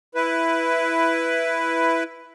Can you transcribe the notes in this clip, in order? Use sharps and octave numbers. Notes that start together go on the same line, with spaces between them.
E4 B4